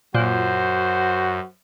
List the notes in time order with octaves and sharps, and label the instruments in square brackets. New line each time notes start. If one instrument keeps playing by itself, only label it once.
[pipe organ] F#2 [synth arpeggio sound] A#2 [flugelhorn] F#4 [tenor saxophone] C5